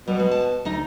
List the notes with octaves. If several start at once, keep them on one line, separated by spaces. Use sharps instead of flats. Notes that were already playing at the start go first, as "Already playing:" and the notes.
B2 G3
G#3
A5
D2 D#4 D#5